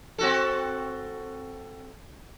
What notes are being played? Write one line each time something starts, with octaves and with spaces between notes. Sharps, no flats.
C4 F#4 A4